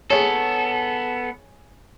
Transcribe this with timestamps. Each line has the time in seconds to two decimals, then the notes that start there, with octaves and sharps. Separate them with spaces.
0.10 B3 G#4 A4 C#5